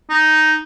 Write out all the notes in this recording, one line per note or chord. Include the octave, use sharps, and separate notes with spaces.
D#4